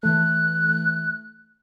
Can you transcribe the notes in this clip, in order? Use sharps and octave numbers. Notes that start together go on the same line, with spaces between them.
E3 A3 F#6